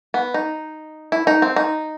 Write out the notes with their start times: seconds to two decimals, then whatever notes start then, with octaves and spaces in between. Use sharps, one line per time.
0.14 B3
0.34 D#4
1.12 E4
1.27 D#4
1.42 C4
1.56 D#4